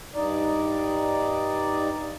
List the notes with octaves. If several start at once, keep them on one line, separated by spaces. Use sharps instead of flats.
G2 D#4 D5